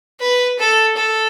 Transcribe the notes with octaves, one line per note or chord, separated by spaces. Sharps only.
B4
A4
A4